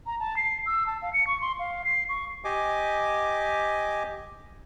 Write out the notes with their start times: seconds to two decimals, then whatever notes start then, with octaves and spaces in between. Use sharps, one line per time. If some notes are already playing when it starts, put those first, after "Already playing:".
0.06 A#5
0.20 A5
0.37 C7
0.66 E6
0.87 A5
1.02 F5
1.13 C#7
1.27 C#6
1.41 C6
1.59 F5
1.84 C7
2.09 C#6
2.45 G4 D#5 G#5 D6